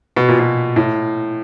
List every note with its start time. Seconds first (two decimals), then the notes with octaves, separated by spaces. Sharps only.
0.16 B2
0.28 A#2
0.39 B2
0.76 A2